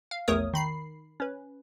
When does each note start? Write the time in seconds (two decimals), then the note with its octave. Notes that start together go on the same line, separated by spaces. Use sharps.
0.11 F5
0.28 A#1 E2 A3 A#4 C#5 D#6
0.54 D#3 B5 C7
1.20 C#4 B4